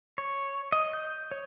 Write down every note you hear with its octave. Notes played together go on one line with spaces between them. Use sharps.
C#5
D#5
G6
C#5